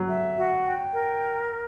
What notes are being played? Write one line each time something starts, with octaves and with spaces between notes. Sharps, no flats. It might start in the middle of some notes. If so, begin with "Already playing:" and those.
Already playing: F#3
E5
F#4
G5
A#4